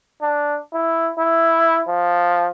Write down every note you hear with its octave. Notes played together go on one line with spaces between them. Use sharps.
D4
E4
E4
F3